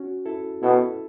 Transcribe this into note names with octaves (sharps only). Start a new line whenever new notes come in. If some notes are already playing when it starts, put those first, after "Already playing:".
Already playing: C#4 F#4
E4 A4
B2 E4 A4